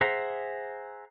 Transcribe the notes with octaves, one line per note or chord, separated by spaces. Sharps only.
G#4 C5 E5 F#5 A#5